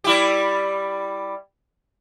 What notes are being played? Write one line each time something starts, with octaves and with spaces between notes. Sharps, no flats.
G3 E4 G4